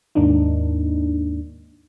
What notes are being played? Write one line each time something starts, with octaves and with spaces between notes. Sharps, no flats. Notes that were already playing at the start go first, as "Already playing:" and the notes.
D#2 G#2 A#3 D4 D#4